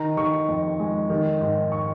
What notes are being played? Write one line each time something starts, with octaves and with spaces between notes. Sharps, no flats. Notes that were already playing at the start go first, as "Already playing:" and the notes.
Already playing: D#3 A#5
D#3 C#6
F2
G#3
D#3
G#2
C#6